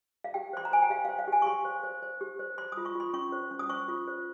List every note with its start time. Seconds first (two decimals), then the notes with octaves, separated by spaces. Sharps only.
0.24 F5
0.34 G4 G5
0.53 C5 C6
0.65 A#5
0.72 C5 G#5
0.82 G5
0.90 G4 F5
1.05 C5 F5
1.19 F5
1.28 G4 G#5
1.42 C#6
1.46 G4 C6
1.65 C5
1.83 C5
2.02 C5
2.21 G4
2.39 C5
2.58 C5 C6
2.72 D#6
2.77 F4
2.85 C#6
2.95 F4 C6
3.14 C#4 C#6
3.32 C5
3.51 C#4
3.59 D#6
3.69 C5 C#6
3.88 F4
4.07 C5